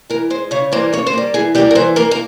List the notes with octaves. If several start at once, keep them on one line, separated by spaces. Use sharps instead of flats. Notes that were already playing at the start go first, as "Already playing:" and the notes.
E3 A#4
G#3 C5
C#3 C#5
E3 G3 A#3 C5
C#3 C#5
C5
G3 A#3
E3 G#4
G3 A#3 G4
A#4
E3 C5
A#3 A#4
A#4